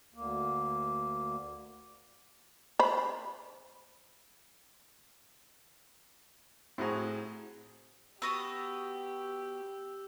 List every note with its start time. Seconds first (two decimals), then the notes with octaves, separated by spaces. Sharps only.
0.14 D2 A#3
2.79 C5 B5
6.78 A2 C4 F#4 G#4 A#5
8.22 B3 F#4 G4 D#6 E6